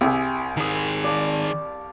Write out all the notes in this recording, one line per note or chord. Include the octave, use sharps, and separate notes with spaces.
C2 G4 G#4 E5
D#3 G#4 A#4 D#6
D5 F5 A5